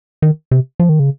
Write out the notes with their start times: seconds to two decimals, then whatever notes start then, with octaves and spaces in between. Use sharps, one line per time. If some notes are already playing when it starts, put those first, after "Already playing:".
0.22 D#3
0.51 C3
0.80 F3
0.89 D#3
1.00 C#3